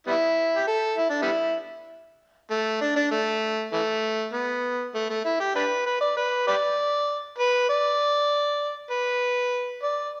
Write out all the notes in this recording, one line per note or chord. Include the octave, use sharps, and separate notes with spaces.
G3 B3 E4
G4
A4
E4
D4
G3 B3 E4
A3
D4
D4
A3
E3 A3
B3
A3
A3
E4
G4
D4 G4 B4
B4
D5
B4
G4 B4 D5
B4
D5
B4
D5